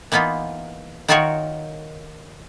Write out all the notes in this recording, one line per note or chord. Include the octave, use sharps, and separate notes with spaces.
E3 A#3 B3 D#4 F4
D#3 D#4 F4 F#4 A#4 C#5